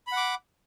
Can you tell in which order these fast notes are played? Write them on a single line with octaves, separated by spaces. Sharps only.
B5 F#5 D6